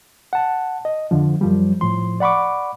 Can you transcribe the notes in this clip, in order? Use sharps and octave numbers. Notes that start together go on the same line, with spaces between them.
F#5 A5
D#5
F2 D3 F3
F#2 F3 G3
A2 F3 C6
D5 F#5 B5 C#6 D6